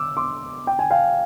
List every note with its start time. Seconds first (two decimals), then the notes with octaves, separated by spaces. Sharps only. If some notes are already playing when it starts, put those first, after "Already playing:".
Already playing: D6 E6
0.17 C6 D6
0.67 G5
0.79 G#5
0.91 F5 G5